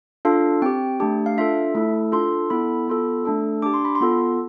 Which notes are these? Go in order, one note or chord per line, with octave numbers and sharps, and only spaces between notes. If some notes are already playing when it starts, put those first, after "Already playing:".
D4 F4 A4 F5
C4 G4 G5
A3 D4 G4
F5
D4 F4 A4 E5
A3 E4 A4
D4 F4 A4 C6
B3 E4 A4 B5
B3 F4 A4
A3 D4 A4
D4 G4 D6
C6
B5
C6
B3 F4 A4